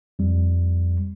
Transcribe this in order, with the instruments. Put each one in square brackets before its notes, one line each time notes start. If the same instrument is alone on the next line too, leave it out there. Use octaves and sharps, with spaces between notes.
[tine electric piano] F2 G3